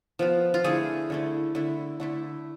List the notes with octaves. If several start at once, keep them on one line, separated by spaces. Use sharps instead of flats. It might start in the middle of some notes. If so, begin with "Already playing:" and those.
F3 B3 F4
F4
D3 A3 E4 G#4
D3 A3 E4
D3 A3 E4
D3 A3 E4